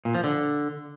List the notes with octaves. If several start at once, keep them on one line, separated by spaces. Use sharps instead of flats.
A#2
F3
D3